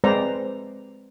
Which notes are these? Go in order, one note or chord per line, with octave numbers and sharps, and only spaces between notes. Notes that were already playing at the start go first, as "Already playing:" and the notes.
G#3 C4 B4 C5 D5 A#5